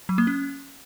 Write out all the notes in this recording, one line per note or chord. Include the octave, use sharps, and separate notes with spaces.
F#3
A#3
C#4